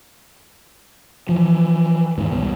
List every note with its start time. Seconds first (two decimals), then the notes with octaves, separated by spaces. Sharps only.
1.29 E3 F3
2.18 E2 G#2 D#3
2.32 E1 C2 B2